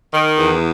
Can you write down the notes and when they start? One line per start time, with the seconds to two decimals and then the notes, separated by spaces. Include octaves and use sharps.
0.10 D#3
0.38 E2